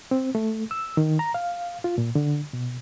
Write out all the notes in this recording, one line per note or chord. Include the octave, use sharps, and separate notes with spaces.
C4
A3
E6
D#3
A#5
F5
F4
A#2
D3
B2